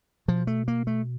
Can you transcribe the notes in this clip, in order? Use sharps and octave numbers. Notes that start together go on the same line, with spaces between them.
B2 F3
A3
A#3
A3